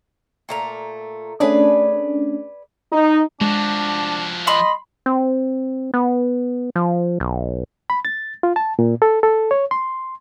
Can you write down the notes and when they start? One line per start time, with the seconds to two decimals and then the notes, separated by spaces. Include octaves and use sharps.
0.49 A#2 A3 A#5
1.40 A3 C#4 D4 G#4 B4 D5
2.92 D#4
3.41 F3 G#3 D4 F#4
4.47 D#5 B5 C6
5.06 C4
5.94 B3
6.76 F3
7.20 B1
7.90 B5
8.05 A6
8.43 F4
8.56 A5
8.79 A#2
9.02 A4
9.23 A4
9.51 C#5
9.71 C6